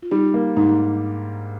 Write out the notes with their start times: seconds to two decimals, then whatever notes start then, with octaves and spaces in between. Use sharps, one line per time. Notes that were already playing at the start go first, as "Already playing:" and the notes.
0.03 F4
0.11 G3 D#4 G4
0.34 A#3
0.56 G#2 D#4 G4